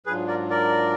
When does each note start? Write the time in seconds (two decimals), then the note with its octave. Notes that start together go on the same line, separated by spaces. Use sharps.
0.06 G#2 F#3 D4 F4 G#4 B4
0.28 A#4 D5
0.50 A#4 D5